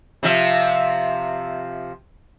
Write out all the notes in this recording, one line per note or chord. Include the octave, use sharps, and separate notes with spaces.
C3 F3 E5